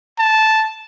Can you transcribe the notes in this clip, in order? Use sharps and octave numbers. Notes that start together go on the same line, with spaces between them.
A5